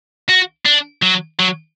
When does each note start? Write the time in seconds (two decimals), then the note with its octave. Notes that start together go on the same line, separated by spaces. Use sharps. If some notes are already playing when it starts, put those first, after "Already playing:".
0.29 F#4
0.66 D4
1.03 F#3
1.40 F#3